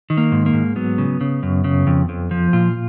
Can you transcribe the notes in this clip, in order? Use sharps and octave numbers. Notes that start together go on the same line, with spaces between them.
D#3
A#3
G#2
A#3
G#2
F#3 B3
C#3
C#3
F#2
C#3
F2
F2
F3
A#2 F4